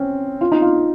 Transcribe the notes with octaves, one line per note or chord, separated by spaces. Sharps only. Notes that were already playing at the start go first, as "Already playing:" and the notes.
Already playing: C4 C#4
F4
D#4
F4